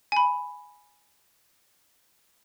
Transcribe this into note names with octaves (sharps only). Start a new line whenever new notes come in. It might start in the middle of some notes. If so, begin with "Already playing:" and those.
G#5 B5